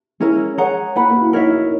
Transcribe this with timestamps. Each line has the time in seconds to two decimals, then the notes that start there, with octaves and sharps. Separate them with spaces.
0.20 G#3 C#4 E4 A#4 E5
0.58 G#4 C#5 F#5 A#5
0.95 A#3 B4 F#5 B5
1.08 A#3
1.16 F#4
1.21 E4
1.33 D#4 A#4 C#5 E5
1.43 E4
1.53 D#4